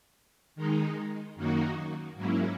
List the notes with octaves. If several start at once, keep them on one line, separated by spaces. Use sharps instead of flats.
D#3 G#3 D#4
F#2 D#3 A#3 D#4 F#4
G#2 F#3 A#3 C#4 E4